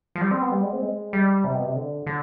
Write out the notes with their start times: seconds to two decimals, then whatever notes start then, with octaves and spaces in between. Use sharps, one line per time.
0.16 F3
0.21 G3
0.31 C4
0.42 B3
0.52 G3
0.62 G#3
0.73 C4
0.82 G#3
1.13 G3
1.44 C3
1.54 B2
1.65 C3
1.76 D3
2.07 D3